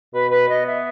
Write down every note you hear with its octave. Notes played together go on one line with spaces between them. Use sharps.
B2 B4
B4
B3 D#5
E5